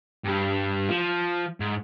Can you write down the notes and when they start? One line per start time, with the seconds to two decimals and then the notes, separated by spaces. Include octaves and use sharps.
0.25 G2 G4
0.89 F3
1.60 G#2